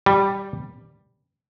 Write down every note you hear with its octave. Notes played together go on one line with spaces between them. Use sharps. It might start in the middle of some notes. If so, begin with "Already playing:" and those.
G3